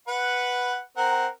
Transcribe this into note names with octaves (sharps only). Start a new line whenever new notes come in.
B4 F#5
C4 A#4 F#5